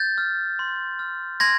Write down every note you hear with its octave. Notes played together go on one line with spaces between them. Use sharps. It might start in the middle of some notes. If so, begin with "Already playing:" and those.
Already playing: G6 A6
F6
C6
F6
C6 G#6 A#6